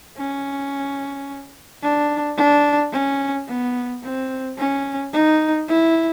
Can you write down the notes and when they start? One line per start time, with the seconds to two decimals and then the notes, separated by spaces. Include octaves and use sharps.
0.17 C#4
1.82 D4
2.37 D4
2.92 C#4
3.48 B3
4.03 C4
4.58 C#4
5.13 D#4
5.68 E4